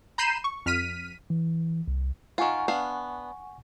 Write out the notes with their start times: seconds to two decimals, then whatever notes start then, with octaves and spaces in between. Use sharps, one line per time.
0.18 A#5 B5 G6 C7 D#7 E7
0.44 C#6
0.66 F2 F6 B6 D#7
1.30 E3
1.88 C2
2.38 D#3 F4 F#5 G#5 C#6
2.68 B3 D4 F5